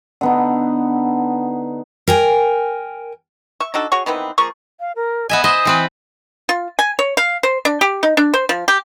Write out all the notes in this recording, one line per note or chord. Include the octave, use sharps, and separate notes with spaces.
D3 B3 D#4
A#4 G5 G#5
E5 C#6
D4 D#4 F#4 A4
F#4 G#4 C#5 C#6
D#3 E3 B3 C4
F3 A#3 G#4 C#6
F5
A#4
B3 D#5 E5 G#5
C5 D#5 E5 D#6
E3 C4 B4
F4
G#5
C#5
F5
C5
D4
G4
D#4
D4
C5
F3
G4